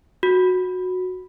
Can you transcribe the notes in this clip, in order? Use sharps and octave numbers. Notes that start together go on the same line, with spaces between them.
F#4